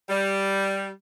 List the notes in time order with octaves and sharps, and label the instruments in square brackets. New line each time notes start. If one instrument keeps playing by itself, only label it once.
[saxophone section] G3